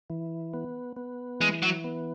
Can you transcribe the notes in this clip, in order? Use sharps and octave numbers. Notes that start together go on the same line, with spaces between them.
E3
B3
B3
E3 G#3
F#3
B3